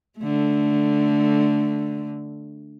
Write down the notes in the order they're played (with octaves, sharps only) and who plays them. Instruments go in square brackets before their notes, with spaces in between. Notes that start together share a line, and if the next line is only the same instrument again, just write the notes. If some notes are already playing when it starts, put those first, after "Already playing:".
[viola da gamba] D3 A3